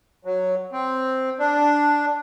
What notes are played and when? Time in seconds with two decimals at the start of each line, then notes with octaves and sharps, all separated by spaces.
0.25 F#3
0.72 C4
1.39 D4